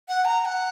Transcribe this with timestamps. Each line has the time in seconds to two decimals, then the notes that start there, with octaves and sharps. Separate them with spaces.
0.09 F#5
0.25 A#5
0.41 A#5
0.45 F#5